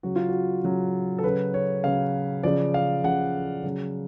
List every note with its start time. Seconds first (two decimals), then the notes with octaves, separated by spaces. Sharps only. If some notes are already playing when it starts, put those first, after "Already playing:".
0.03 C#3 F#3 F#4
0.16 F4
0.29 F#4
0.64 C#3 F#3
1.18 A4
1.24 C#3 F#3 B4
1.54 C#5
1.84 C#3 F#3 F5
2.43 C#3 F3 D5
2.74 F5
3.04 C#3 F3 F#5
3.64 C#3 F#3